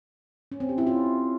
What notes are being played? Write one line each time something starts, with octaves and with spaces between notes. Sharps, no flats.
C#4
C4
G4
E4
F4